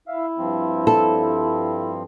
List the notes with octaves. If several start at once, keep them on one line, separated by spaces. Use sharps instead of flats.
E4 E5 F5
G2 F3 C4
A4